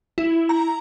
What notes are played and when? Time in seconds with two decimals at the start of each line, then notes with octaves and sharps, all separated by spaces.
0.18 E4
0.49 A#5